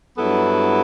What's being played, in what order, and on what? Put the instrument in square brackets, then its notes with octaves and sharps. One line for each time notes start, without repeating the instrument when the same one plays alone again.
[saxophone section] G2 F#3 B3 E4 A4